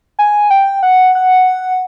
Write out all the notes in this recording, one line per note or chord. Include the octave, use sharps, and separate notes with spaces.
G#5
G5
F#5
F#5